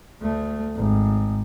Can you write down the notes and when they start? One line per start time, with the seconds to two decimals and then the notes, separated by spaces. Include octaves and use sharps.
0.22 D2 A3
0.76 G#1